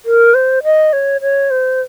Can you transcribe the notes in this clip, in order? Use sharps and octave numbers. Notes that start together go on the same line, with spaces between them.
A#4
C5
D#5
C#5
C#5
C5